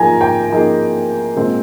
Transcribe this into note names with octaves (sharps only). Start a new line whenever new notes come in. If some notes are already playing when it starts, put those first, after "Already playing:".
Already playing: F3 A#3 D#4 G#4 G#5 A#5
G5
F3 A#3 D#4 G#4
A#2 G#3 C4